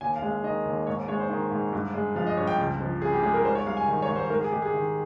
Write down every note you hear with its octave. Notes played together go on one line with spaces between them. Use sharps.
D#2 G#5
F5
G#3
F5
D#3 D#5
D#2
G#2 C#5
G#3 C#5
C5
D#3
G#2
G2
G#3
F3 F5
D#5
G2 C#5
G5
C#2
F3
C#3 G#4
G4
G#3 G#4
A#4
G#2 C5
C#5
G3 F5
G#5
D#3
C#5
G#2
C5
G#2 A#4
G#4
G#3 G4
G#4
D#3